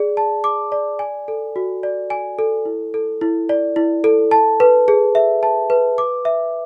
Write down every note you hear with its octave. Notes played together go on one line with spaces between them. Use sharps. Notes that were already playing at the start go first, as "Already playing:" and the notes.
Already playing: G#4 D5
A5
D6
D5
G#5
A4
F#4
D5
G#5
A4
E4
A4
E4
D5
E4
A4
A5
B4
G#4
E5
A5
B4
D6
E5